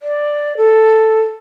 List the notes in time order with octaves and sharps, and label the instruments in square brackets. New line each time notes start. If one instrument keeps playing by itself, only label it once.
[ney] D5
A4